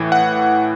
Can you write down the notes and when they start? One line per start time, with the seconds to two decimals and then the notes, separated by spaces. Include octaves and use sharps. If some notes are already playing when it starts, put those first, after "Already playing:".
Already playing: A2 E3
0.12 F#5